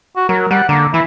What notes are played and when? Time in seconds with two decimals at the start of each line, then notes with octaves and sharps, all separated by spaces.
0.16 F#4
0.29 F#3 A#4
0.51 G3 F#5
0.69 D3 A#3
0.94 E3 E4